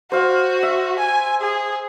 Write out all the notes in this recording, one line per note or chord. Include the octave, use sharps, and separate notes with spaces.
F#4 C5 F5
E5
G#5
G#4